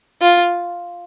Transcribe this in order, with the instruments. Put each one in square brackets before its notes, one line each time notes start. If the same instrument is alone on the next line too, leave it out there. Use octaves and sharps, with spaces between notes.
[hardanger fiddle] F4